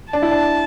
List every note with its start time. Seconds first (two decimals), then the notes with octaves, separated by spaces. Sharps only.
0.13 D4 A5
0.22 E4
0.31 D4